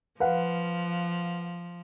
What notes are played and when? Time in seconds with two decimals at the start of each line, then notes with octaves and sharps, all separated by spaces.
0.20 F3 B4 F5 F#5